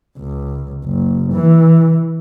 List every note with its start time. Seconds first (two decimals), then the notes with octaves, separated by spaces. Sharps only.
0.18 C#2
0.85 F#1
1.33 E3